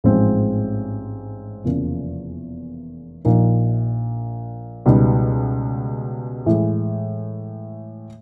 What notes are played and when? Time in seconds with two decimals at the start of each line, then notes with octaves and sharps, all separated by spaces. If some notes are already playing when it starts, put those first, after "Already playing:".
0.04 A1 G#2 F3 G#3 C4
1.64 F1 E2 C#3 F3 A#3
3.25 A#1 A#2 F3 A#3 D#4
4.86 C#2 B2 G3 B3 D#4
6.46 A2 E3 G#3